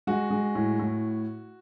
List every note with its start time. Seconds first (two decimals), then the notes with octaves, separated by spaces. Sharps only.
0.07 G#3 F#4
0.30 G#3
0.55 A2
0.79 A2